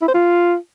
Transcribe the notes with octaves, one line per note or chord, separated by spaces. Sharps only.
E4
C5
F4